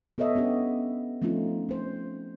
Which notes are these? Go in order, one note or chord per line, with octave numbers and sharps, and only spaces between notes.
B3 A4 C#5 D#5 E5
B3 C#4 D4 G4
F3 A3 C4 C#4 D#4 F4
C#4 C5